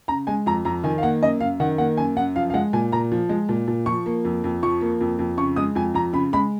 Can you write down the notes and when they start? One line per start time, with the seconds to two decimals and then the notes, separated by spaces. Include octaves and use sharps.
0.08 C#3 A#5
0.27 G#3 G#5
0.46 F2 A#5
0.65 F2 A#5
0.84 D#3 G#5
0.98 F5
1.03 A#3 F#5
1.22 F#2 D#5
1.40 F#2 F5
1.60 D#3 F#5
1.78 A#3 F#5
1.97 F#2 G#5
2.16 F#2 F#5
2.36 F3 F5
2.50 F5
2.54 G#3 F#5
2.73 A#2 G#5
2.92 A#2 A#5
3.12 F3
3.29 G#3
3.49 A#2
3.68 A#2
3.86 F3 C#6
4.06 A#3
4.25 F2
4.44 F2
4.63 F3 C#6
4.81 A#3
5.01 F2
5.19 F2
5.37 C#3 C#6
5.56 G#3 D#6
5.75 F2 G#5
5.94 F2 A#5
6.13 C#3 B5
6.33 G#3 B5